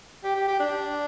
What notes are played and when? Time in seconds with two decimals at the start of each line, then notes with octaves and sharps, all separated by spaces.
0.24 G4
0.36 G4
0.48 G4
0.60 D4